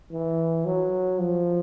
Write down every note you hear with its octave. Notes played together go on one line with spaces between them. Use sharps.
E3
F#3
F3